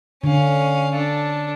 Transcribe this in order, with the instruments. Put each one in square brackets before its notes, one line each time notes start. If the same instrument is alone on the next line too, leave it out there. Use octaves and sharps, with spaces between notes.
[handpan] D3 [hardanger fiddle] C#4 F5
[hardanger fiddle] D4 A4